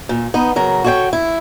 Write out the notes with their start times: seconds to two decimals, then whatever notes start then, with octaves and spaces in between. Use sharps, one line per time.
0.09 A#2
0.34 B3 D#4
0.56 C#3 F#3 A#4
0.84 F#4 A4 C#5 D5 G5
1.13 E4